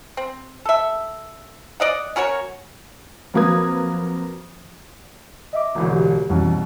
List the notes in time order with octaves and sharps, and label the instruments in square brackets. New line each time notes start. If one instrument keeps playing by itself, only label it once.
[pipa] C4
A4 E5
D5 D#5 F#5
C#4 F#4 A#4 C#5
[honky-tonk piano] F2 F#3 A#3 B4 D#6 G#6
[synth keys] D#5 E5 D6
[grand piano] E1 A1 D2
[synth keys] G4
[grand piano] C2 B2 [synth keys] F2 E3 C#4